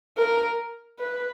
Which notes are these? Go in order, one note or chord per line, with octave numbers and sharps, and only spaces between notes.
A#4
B4